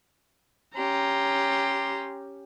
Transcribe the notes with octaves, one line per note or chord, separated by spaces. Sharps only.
C#4 G4 A#5 C6